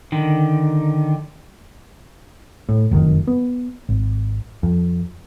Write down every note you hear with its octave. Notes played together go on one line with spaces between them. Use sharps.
D3 D#3
A2
F1 F#2 A#2 D#3
B3
G#1
F2